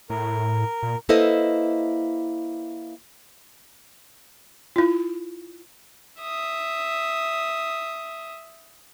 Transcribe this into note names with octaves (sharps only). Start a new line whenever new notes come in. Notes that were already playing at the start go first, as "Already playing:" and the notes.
A2 A#4
A#2
A#3 E4 A4 B4 C5 D#5
E4 F4
E5 D#6